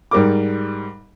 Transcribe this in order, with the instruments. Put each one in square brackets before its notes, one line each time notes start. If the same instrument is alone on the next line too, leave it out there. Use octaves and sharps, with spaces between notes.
[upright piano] G#2 G3 A#4 D6